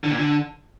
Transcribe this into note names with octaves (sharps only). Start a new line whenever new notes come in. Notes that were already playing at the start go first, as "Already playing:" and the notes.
D3
A#2
D3